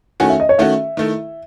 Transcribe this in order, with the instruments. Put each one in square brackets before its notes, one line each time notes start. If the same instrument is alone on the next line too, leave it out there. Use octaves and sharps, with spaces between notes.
[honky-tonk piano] D#3 A3 C#4 F#4 [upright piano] G#5
[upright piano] E5
D#5
C#5
[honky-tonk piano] D#3 A3 C#4 F#4 [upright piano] E5
[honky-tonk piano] D#3 A3 E4